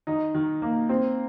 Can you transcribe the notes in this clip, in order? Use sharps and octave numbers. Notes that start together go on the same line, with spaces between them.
D#3 D#4
D#3
A#3
C4